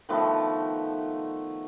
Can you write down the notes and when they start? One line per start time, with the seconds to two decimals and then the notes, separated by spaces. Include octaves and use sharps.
0.09 D#3 F3 A3 B3